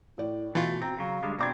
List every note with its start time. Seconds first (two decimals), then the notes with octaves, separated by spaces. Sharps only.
0.18 A2 E4 D5
0.55 B2 E3 A3 F4 F#4
0.82 C4 F#4 A#5
0.98 C#3 F#3 F5
1.23 D3 G3 G#3
1.39 B2 C4 D4 D5 A#5 D6 G#6